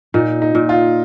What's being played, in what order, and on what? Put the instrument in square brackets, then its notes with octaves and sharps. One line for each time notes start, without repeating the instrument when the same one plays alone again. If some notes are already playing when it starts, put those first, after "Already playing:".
[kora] A#2 [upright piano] D#4
[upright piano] D#4
[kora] A#2
[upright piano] F4